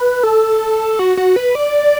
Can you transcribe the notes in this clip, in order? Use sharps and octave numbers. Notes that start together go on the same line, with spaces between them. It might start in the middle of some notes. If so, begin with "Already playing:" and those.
Already playing: B4
A4
F#4
F#4
B4
D5